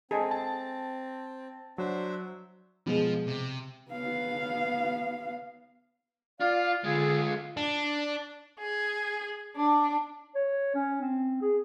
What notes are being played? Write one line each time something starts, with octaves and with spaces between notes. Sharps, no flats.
C4 G#4 A4 D#5
A5
F#3 D4 C5 E5
B2 F3 G#3
C3
B3 F5
F4 D5 F5
D3 G#3 F4 G#4
D4
G#4
D4
C#5
C#4
C4
G#4